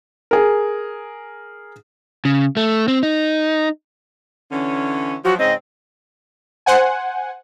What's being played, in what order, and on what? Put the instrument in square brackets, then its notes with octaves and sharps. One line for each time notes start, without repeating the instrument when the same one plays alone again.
[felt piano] G#4 A#4
[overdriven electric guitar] C#3
A3
C4
D#4
[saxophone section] D3 E3 C#4
[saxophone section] F3 F#3 [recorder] F#4
[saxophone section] G#2 C#3 C4 [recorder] D#5
[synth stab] C5 F#5 G#5